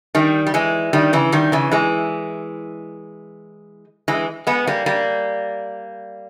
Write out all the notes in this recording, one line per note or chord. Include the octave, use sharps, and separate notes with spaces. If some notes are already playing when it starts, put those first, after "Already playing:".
D#3 G3
G3
E3 G#3
D#3 G3
C#3 E3
D#3 G3
C#3 E3
E3 G#3
E3 G#3
G#3 B3
G3 A#3
G3 A#3